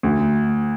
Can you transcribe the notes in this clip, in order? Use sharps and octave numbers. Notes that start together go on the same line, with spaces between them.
D2